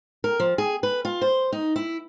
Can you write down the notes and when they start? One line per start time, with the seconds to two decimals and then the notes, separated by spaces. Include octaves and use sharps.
0.24 A#4
0.40 F3
0.58 G#4
0.83 B4
1.05 F4
1.22 C5
1.52 D#4
1.76 E4